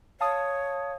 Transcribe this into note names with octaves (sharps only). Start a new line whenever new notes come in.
C#5 F5 A5 D#6